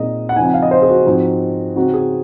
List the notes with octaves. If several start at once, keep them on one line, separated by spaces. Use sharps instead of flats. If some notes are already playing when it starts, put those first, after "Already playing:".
Already playing: A#2 G#3 C4 D#4 D#5
F#5
C#3 F3 C4 D#4 G#5
F#5
F5
D#5
C5
G#4
F#4
G#2 F3 C4 D#4
C#3 G#3 C4 D#4 F#4
G#4